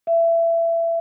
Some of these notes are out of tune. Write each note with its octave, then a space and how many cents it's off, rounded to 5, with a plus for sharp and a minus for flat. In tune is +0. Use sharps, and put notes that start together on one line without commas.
E5 +25